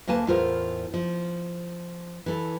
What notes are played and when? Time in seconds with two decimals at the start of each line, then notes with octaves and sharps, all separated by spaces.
0.07 D2 A#3 B4 G#5 A5
0.27 E2 A2 F4 A#4 C5
0.94 F3
2.26 E3 A4